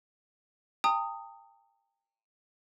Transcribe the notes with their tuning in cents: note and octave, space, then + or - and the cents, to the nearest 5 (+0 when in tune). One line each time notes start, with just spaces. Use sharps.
G5 +30 A#5 -45 D#6 +0